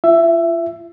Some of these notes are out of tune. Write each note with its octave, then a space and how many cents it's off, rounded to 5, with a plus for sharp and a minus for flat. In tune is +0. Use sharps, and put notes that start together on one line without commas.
F4 -35 E5 +15